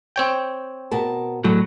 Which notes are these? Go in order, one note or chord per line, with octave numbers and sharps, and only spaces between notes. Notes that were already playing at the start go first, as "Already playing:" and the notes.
C4 C#5 G5
B2 A#4 A5
A2 F#3 A4